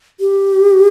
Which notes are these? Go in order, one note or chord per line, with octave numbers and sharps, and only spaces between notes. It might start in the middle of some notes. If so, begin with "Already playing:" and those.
G4